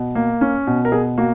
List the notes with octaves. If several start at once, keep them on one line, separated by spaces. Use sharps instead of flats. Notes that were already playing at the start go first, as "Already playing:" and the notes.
Already playing: B2
A#3
C#4
B2
A#4
B2 G#4
A#3 F#4